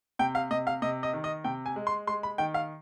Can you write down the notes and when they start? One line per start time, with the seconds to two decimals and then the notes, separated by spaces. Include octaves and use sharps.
0.19 C3 G5
0.35 F5
0.51 C3 D#5
0.67 F5
0.82 C3 D#5
1.03 D#5
1.13 D#3
1.24 D#5
1.44 C3 G5
1.66 G#5
1.76 G#3
1.87 C6
2.07 G#3 C6
2.23 B5
2.38 D#3 G5
2.54 F5